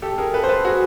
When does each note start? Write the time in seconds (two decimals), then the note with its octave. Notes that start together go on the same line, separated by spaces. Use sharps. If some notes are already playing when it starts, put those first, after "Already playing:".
0.02 G4 A4
0.18 G#4 A#4
0.34 A4 B4
0.43 C5
0.49 A4 B4
0.65 F#4 G#4